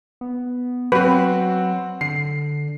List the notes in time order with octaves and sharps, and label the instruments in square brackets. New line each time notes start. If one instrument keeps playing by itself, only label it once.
[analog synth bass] B3
[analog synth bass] F#3 [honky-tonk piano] C4 F#4 [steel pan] B4
[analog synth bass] D3 [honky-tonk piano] C7